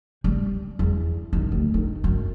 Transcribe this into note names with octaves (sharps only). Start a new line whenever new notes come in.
G3
E2
D#2
D2
D#3
F#2